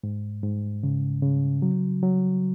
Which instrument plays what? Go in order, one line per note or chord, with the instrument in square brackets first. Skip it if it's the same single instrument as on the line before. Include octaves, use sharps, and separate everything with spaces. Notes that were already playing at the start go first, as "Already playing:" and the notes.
[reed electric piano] G#2
G#2
C#3
C#3
F#3
F#3